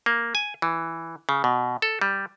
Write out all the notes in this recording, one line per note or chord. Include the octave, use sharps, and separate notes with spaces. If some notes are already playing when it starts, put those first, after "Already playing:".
A#3
G#5
E3
C#3
B2
A4
G3